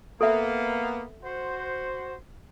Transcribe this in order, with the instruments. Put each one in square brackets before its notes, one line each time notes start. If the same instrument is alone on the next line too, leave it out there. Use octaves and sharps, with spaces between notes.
[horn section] A#3 B3 [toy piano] A4 E5
[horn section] F#4 C5